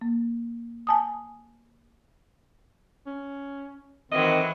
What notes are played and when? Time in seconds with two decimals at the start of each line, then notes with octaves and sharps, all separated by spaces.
0.01 A#3
0.87 G#5 A5 D#6
3.06 C#4
4.12 A2 D#3 E3 F#3 C4 D#5